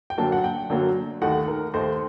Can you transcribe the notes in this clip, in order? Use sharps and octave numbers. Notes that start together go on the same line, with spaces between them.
G5
F#2 D3 F#3 A#3 A5
F#5
G5
F#2 D3 F#3 A#3
D#2 D#3 A3 F#5
A#4
D#2 D#3 A3 C5